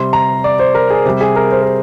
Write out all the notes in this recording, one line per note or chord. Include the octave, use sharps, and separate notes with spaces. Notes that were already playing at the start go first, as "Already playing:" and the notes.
Already playing: C3 G3 C6
A#5
D5
C5
A#4
G#4
C3 G3 G4
G#4
A#4
C5
A#4